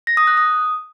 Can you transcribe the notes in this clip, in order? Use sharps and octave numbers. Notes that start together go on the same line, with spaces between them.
A#6
D#6
F#6
D#6